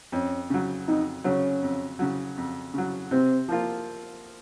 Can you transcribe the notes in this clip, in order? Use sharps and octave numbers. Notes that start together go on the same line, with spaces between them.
F2 C#4
C#3 F#3
F2 D#4
C#3 F#3 C#4
F2
C#3 F#3
F2
C#3 F#3
C3 C4
F3 A#3 F4